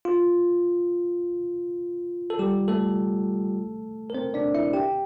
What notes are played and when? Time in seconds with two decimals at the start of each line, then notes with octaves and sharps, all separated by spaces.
0.05 F4
2.30 A4
2.39 G3 G4
2.68 A3 A4
4.10 A#4
4.15 C4 C5
4.34 D4 D5
4.54 E4 E5
4.73 G4 G5